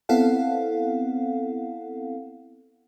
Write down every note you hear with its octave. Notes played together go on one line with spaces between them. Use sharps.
B3 C4 E4 A4 F5 F#5